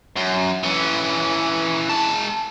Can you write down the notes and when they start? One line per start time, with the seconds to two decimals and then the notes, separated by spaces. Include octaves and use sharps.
0.17 F#2
0.64 E3 C#4
1.89 G#3 A5